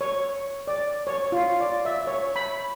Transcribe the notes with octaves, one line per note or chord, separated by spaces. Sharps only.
C#5
D5
C#5
F4
D5
E5
C#5
B5